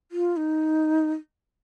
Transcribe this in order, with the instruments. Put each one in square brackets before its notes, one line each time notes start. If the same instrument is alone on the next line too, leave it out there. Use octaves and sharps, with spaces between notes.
[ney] F4
D#4